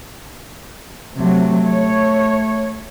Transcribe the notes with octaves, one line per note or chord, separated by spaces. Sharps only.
C3 F#3 A3
C#5